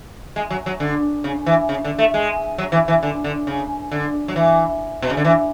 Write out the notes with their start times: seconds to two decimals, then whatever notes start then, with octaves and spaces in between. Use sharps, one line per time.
0.36 G#3
0.50 F#3
0.66 F#3
0.80 D3
1.24 C#3
1.46 E3
1.69 C#3
1.85 D3
1.99 A3
2.14 G#3
2.58 F#3
2.72 E3
2.88 E3
3.03 D3
3.24 D3
3.47 C#3
3.91 D3
4.28 F#3
4.36 E3
5.02 B2
5.10 C#3
5.17 D3
5.25 E3